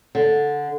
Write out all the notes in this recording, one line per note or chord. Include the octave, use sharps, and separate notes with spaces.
D3